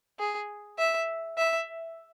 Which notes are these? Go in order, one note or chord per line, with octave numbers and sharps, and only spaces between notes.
G#4
E5
E5